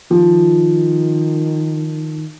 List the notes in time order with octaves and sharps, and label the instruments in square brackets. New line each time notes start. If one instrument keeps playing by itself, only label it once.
[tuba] D#3 [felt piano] F3